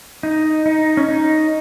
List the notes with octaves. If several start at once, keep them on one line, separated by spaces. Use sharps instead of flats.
D#4
D#4
C#4
D#4